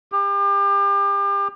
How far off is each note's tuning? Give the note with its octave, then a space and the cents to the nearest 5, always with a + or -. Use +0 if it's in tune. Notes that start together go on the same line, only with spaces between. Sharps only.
G4 +35